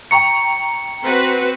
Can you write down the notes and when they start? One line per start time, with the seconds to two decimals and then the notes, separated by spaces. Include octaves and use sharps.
0.11 G5 A#5 C#6 C#7
1.03 C4 F#4 B4